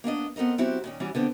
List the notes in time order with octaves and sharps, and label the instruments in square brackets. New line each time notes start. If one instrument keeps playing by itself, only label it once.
[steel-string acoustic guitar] A#3 B3 D4 D#5
B3 C4 A4 A#4 D#5
F#3 C4 E4 F#4 G4
A#2 D#3 C#4
E3 G3 C#4 F#4
D3 B3 C4